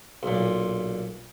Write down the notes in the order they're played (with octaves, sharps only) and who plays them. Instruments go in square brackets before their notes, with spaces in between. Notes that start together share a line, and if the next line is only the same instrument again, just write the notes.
[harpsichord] B1 A#2